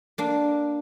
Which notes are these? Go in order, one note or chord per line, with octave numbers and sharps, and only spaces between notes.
A#3 D4